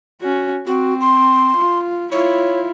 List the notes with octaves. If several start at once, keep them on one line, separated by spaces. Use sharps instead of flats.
C#4 F#4
C4 F#4
C6
F4
E4 F4 C#5